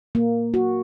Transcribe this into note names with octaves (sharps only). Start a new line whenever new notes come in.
A#3
F#4